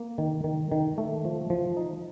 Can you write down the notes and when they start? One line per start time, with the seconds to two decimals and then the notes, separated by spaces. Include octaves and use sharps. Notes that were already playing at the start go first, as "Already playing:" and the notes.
Already playing: A#3
0.18 D#3
0.44 D#3
0.72 D#3
0.98 A3
1.25 F3
1.50 F3
1.77 D#4